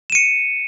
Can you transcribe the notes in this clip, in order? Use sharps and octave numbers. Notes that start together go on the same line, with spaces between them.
C#7 D#7 E7